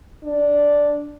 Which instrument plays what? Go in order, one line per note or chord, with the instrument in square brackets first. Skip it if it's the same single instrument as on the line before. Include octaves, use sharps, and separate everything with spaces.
[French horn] D4